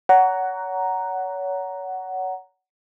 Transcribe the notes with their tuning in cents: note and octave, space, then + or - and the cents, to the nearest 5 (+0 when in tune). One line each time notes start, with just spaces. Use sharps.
C#5 +30 F#5 +10 A#5 +0